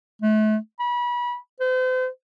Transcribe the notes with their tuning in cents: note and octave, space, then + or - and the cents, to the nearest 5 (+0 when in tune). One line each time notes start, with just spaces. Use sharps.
A3 -35
B5 -30
C5 -40